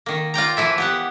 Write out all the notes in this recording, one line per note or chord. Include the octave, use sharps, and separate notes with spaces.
D#3 A#3
F4 D5 G5 A#5
E3 F3 E4 E5
B3 G4 F#5